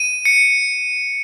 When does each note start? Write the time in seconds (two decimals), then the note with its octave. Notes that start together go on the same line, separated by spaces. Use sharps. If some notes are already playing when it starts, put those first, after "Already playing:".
Already playing: D#7
0.25 C#7